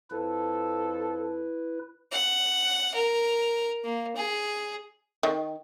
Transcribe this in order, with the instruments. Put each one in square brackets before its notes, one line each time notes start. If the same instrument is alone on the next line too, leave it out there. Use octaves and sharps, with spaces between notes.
[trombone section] F2 A4 [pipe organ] E4 B4
[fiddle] F#5
A#4
A#3
G#4
[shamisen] D#3